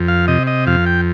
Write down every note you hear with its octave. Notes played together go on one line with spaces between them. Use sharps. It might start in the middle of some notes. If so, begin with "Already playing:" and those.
Already playing: F2
F5
C3 D#5
D#5
F2 F5
G5